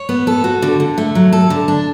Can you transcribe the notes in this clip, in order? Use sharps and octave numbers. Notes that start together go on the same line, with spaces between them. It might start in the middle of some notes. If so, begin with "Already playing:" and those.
Already playing: C#5
B3
A4
F#4
D3
D3
A3
F#3
A4
D3
D4